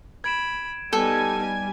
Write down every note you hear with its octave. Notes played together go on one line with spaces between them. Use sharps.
B5 G#6 D7 E7
G3 B3 D#4 A4 G#5